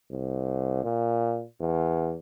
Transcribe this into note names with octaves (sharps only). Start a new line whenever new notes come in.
C2
A#2
E2